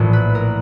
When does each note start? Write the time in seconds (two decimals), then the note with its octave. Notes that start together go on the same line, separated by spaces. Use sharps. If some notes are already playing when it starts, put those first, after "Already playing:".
Already playing: A#1 A2 E3
0.13 B4
0.35 A#4